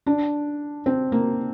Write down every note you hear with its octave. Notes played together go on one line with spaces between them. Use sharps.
D4
C4
A#3